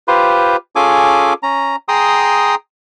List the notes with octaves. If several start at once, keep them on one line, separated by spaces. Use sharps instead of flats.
F4 G4 B4 C5
C#4 F4 G#4 A4 G#5 D6
C#4 A#5
G#4 G5 A#5 C6 D#6